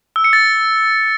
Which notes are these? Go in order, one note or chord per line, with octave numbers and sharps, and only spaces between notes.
E6
C#7
A6